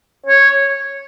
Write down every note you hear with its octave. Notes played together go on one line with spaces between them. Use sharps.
C#5